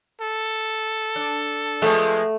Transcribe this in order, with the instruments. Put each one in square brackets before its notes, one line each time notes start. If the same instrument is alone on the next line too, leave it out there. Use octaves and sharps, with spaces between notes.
[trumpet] A4
[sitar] D4
[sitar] F3 G#3 B3 [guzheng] A3